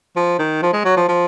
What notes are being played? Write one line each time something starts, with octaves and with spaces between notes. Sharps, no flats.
F3
D#3
F3
G#3
F#3
F3
F3